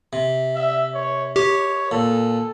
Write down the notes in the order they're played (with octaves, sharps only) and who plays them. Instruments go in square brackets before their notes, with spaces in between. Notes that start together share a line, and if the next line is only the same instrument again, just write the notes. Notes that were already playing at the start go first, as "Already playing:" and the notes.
[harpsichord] C3
[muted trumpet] E5
C#5
[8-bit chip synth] G4 [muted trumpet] C#5
[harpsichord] A#2 [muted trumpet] A4